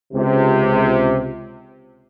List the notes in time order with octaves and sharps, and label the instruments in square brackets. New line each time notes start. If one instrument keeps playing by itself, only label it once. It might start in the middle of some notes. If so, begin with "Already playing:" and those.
[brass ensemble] C#2 C3